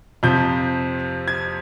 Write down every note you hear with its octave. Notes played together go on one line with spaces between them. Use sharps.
F2 C3 F3 G6
G#6